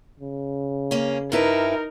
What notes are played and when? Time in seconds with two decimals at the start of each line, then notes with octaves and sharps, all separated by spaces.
0.20 C#3
0.91 A#3 C#4
1.32 G2 D#4 E4 A#4 B4